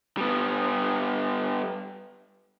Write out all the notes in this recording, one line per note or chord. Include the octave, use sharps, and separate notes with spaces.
G3 B3